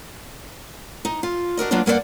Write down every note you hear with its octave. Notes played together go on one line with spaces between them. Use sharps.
D#4
F4
D4 F#4 A#4 D#5
F#3 A#3 B3 D4 F4
G2 A#3 F#4 D5 F#5